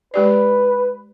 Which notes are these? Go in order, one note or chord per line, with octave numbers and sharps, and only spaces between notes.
G#3 G4 B4 D5